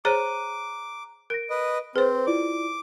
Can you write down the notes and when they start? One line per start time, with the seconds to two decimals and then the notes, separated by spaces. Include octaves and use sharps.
0.05 G#4 C5 C#5 A#5 D6 F#6 D#7
1.30 A#4 A#6 D7
1.50 B4 D#5
1.96 C4 G#4 B4 C5
2.27 E4 F4 D5 D6